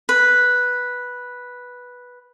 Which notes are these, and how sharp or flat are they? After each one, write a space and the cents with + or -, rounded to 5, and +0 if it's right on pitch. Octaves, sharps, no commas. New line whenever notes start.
B4 -5